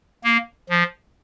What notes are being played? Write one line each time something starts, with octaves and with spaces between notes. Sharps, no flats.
A#3
F3